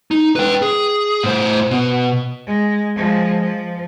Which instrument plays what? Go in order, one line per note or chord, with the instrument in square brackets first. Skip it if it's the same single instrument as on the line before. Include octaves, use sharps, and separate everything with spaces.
[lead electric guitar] D#4
B4 G5
G#4
A2 C5
B2
[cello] G#3
F3 G#3
F3